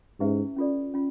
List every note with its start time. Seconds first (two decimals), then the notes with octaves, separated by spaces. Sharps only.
0.20 G#2 C#4 E4 G4 B4 E5
0.56 C#4 F4 A4 D5
0.94 C#4 F4